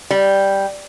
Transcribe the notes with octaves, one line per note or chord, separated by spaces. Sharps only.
G3